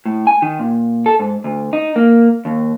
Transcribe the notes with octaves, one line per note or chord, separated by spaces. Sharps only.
A2
G#5
D#3
A#2
A4
G#2
D2
D#4
A#3
D#2